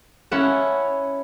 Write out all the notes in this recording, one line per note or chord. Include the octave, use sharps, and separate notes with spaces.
C#4 E4 F#5 A5